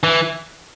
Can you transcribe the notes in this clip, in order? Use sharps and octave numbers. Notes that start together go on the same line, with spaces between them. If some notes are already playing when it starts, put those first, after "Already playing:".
E3